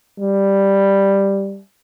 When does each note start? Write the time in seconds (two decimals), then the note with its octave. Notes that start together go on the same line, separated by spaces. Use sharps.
0.20 G3